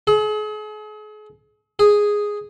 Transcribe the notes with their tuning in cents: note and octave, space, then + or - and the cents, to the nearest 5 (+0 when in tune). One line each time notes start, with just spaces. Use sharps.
G#4 +40
G#4 -5